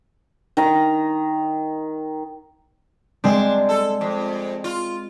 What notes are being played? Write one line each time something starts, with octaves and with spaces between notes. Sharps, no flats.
D#3 A#5
G#3 C4 D4
A4
F2
F4